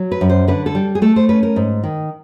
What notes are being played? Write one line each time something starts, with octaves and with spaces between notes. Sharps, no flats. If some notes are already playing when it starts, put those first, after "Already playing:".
Already playing: F#3
B4
F#2
C5
D3 B4
A4
G3
G#4
A3 A4
C5
C#4 B4
A#4
G#2
D#3